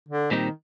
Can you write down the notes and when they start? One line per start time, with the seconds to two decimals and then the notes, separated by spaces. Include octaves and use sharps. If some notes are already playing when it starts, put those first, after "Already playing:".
0.09 D3
0.31 A#2 D#3 G3 C4 D#4